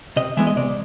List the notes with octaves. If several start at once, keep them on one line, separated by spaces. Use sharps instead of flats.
C3 D#5
E3 G#3 B3 E5
D#5
C3 D5